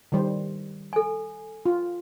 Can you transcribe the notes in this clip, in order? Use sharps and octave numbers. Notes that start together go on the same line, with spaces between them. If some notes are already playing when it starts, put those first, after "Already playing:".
D#3 G3 C5
A4 G#5
F4